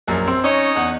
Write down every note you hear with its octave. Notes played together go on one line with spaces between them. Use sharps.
A#1 F#2 A#4
C4 C6 E6
C#4 D#4 C#5 D#5
E2 F#5